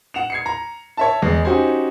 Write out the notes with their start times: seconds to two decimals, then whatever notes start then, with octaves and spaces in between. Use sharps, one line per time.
0.14 F#5 E7 F7
0.30 G#6 C7 C#7
0.46 A#5
0.97 C#5 E5 A5
1.22 E2 G#3
1.45 C#4 D#4 F#4 G4 C5 G#5